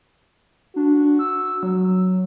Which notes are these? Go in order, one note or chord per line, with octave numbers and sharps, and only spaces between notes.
D4 F#4
E6
F#3